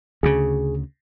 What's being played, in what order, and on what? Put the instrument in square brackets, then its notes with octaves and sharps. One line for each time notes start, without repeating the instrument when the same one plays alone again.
[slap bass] D2 C#3 [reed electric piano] G#4